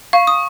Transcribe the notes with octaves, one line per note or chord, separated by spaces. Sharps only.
F5 C#6
D#6